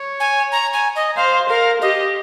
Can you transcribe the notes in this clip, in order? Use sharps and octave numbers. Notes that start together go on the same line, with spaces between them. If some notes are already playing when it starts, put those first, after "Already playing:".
Already playing: C#5
G#5
A#5
G#5
D#5
C5 F5
A#4 F5
G4 D#5